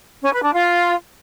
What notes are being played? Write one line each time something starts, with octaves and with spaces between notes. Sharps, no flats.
C#4
B4
D4
F4